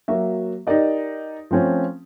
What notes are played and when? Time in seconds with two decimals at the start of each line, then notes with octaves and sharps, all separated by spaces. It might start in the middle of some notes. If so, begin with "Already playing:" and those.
0.08 F#3 A#3 F#4 E5
0.67 D#4 G4 A#4 D5 D#5
1.51 F3 A3 C4 C#4